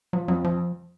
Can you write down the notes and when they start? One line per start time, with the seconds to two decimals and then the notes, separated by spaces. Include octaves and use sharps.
0.13 F3 F#3
0.28 F2 F#3
0.44 F3